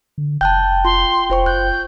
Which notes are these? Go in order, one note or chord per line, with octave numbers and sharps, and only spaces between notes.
D3
F1 G5 A5 F#6 G6
F4 C6
F1 F4 C5 C#6
F#1 F#6 G6